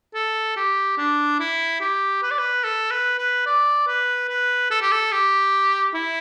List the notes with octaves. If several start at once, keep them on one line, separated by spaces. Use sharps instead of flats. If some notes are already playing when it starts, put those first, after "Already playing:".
A4
G4
D4
E4
G4
B4
D5
B4
A4
B4
B4
D5
B4
B4
A4
G4
A4
G4
E4